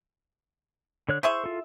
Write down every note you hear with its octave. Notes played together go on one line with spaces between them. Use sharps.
D3 C#5 F#6
E4 G#4 C5 E5 C6 C#6
F4 A4